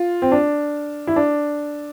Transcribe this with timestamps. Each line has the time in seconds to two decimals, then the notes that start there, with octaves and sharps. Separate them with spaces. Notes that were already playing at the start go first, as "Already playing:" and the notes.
Already playing: F4
0.22 C4
0.32 D4
1.07 E4
1.16 D4